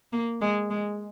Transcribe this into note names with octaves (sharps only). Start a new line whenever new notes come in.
A#3
G#3
G#3